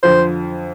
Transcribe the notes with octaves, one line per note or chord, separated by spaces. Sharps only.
F2 D3 F3 C5